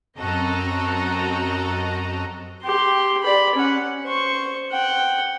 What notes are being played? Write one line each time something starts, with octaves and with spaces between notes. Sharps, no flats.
F#2 C4 F#4 A4 D#5 A#5
G4 C6
D5 B5
C#4 F#5
C5 C#6
F#5 G5